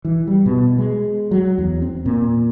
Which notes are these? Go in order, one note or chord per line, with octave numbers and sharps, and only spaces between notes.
E3
G3
B2
G#3
F#3
E2
C4
A#2